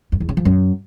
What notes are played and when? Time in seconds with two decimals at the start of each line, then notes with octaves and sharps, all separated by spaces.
0.12 F2
0.20 E2
0.29 C#3
0.37 F3
0.45 F#2